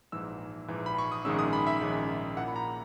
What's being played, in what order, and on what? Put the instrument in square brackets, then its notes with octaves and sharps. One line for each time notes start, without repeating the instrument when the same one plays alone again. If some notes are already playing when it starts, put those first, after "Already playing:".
[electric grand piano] A#1 G#2 E3 E6
A#1 G#2 E3
B5
C#6
D#6
A#1 G#2 D#3 G#3 C#4 E6
D#6
B5
E5
A#1 G#2 D#3 G#3 C#4
A#2 A#3 E4 F#5
B5
A#5